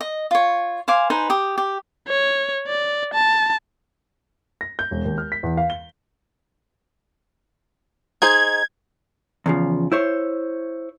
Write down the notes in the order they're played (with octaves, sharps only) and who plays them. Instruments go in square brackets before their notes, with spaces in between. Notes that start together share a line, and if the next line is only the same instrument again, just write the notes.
[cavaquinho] D#5
F4 C#5
C5 F5 G#5 D6
D#4 B4 C5 G#5
G4 D#6
G4
[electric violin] C#5
D5
A5
[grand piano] A#6
G6
E1
D#2
F6
B6
E2
F5
G7
[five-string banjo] D#4 G#4 C5 [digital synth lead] G#6
[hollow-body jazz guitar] E2 C#3 F3
E4 C5 C#5